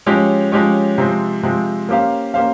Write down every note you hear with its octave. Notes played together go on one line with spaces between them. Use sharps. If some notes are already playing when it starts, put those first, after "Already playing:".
F3 G#3 C#4 G4 C#5
F3 G#3 C#4 G4 C#5
C3 F3 G#3 C4
C3 F3 G#3 C4
A#3 C#4 G4 C5 F5
A#3 C#4 G4 C5 F5